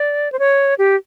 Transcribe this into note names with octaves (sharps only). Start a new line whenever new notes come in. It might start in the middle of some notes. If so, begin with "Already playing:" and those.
Already playing: D5
C5
C#5
G4